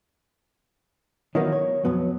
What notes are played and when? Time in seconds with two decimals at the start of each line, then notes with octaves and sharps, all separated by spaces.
1.35 D#3 E3 F#3 A#3 B3 D#4
1.52 C#5
1.85 B1 F2 F#3 B3